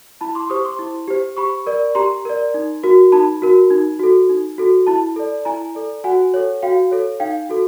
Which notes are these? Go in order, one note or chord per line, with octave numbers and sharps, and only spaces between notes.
E4 A5 B5
C6 D6
G4 C5 C#6 D#6
C6 D6
E4
G4 C5
G4 B5 C#6
A#4 D5
G4 A#5 C6
A#4 D5
D#4
F#4 A#4
D#4 A5 B5
F#4 A#4
D#4
F#4 A4
D#4
F#4 A4
E4 A5 B5
A4 D5
E4 G#5 A#5
A4 D5
F#4 F#5 G#5
A4 C#5
F#4 F5 G5
A4 C#5
D#4 F5 G5
F#4 A4